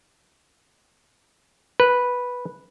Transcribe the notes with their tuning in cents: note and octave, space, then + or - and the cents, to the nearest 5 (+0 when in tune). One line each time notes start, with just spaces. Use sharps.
B4 -5